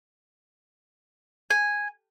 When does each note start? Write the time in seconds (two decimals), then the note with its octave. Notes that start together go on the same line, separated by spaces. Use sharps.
1.50 G#5